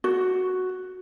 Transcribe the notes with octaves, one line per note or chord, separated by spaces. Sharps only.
F#4